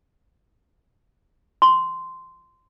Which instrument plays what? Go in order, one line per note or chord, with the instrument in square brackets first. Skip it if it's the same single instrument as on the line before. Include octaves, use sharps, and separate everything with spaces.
[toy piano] C6